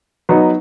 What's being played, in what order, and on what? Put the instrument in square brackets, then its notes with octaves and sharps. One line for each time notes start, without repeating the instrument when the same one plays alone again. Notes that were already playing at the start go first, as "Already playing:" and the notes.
[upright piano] F#3 B3 D#4